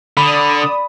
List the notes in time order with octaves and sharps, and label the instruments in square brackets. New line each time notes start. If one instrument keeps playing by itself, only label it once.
[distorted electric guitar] D3 [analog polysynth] D5 D#6 [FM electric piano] B5